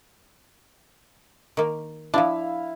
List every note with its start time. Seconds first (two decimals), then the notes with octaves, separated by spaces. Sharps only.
1.57 D#3 A#3
2.14 F3 D4 E4 F5